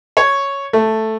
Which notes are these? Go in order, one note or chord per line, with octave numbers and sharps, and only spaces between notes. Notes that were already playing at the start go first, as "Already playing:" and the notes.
C#5
A3